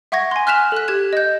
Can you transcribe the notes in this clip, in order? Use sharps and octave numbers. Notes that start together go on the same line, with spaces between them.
E5 F#5 C#6 G#6 A#6
G#5 C6
F6 F#6 B6 E7 F7
A4 F#6
G4 G#6 E7
D#5 G6